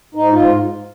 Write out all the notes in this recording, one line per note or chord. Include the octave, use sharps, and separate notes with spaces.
G#2 D#4
G#2 F4